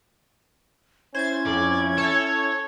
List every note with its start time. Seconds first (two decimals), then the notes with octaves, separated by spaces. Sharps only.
1.15 C#4 E4 C5 G#6 A6
1.46 F2 D5
1.98 A4 C#5